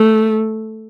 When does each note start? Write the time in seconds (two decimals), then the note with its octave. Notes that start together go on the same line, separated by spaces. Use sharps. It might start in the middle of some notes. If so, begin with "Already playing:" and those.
Already playing: A3